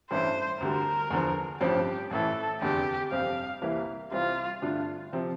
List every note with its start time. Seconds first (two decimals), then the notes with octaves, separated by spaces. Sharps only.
0.10 A1 G2 E3 A3 E4 C5
0.60 D2 D3 G3 A#4
1.10 E2 D3 F3
1.60 A1 G2 F3 C4 F4 G4
2.11 A1 A2 E3 A4
2.61 F1 E2 D3 G4
3.11 G1 F2 C3 G3 C4 F5
3.62 C2 C3 E3 A#3 E4
4.11 C2 C3 E3 G3 C4 F4
4.62 G2 D3 A3 D4 F4
5.13 C3 F3 C4